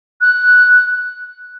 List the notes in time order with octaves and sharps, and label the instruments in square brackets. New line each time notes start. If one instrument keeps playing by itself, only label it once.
[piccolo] F#6